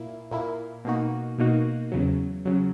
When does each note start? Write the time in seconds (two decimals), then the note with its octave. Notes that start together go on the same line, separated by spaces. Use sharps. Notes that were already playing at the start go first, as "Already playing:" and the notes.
Already playing: A#2 A#3 E4
0.31 A#2 A#3 E4
0.85 B2 A#3 D#4 F#4
1.38 B2 A#3 D#4 F#4
1.92 E2 C#3 F#3
2.45 C#3 F#3